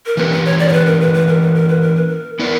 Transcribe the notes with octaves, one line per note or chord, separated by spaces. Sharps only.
A#4
E3 A#3 C#4 G4 B4
B4
C#5
D5
C#5
B4
A#4
B4
B4
A#4
B4
A#4
B4
A#4
B4
A#4
B3 E4 A#4 B4 D5